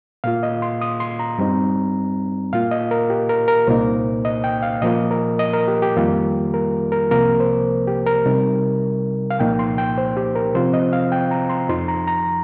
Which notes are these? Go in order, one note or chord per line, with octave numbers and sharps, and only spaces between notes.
A#2 A#3 F4 F5
D#5
C6
D#6
C6
A#5
G2 G3 C4 D#4
A#2 A#3 F4 F5
D#5
A#4
G4
A#4
A#4
C2 A#2 A#3 D#4 C5
D#5
G5
F5
A#2 F3 A#3 F4 D#5
A#4
D#5
A#4
G4
G4
F2 D#3 G3 A#3 F4
A#4
A#4
C2 C3 F3 A#3 A#4
C5
G4
A#4
C3 G3 D#4
F5
C2 A#2 F3 A#3 D#4 G5
C6
G5
C5
G4
A#4
C3 F3 C4 F4 C5
D#5
F5
G5
A#5
C6
F2 F3 D#4 C6
A#5
A#5